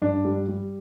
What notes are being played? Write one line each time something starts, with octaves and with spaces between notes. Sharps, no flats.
G2 D4
G3
G3